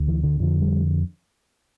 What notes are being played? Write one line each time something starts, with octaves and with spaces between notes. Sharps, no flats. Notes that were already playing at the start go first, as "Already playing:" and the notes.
Already playing: D2
E3
D3
F2 D3 F3
G3